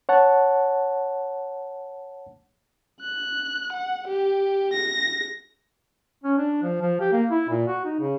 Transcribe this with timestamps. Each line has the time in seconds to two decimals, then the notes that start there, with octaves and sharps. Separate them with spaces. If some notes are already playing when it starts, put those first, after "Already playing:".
0.09 C#5 F#5 A5
3.01 F#6
3.72 F#5
4.08 G4
4.73 A#6
6.24 C#4
6.38 D4
6.63 F3
6.81 F3
7.00 G4
7.12 A#3
7.30 E4
7.49 A#2
7.68 F#4
7.85 D#4
8.00 C#3